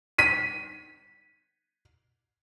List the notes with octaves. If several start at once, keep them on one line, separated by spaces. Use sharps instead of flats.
B6 D#7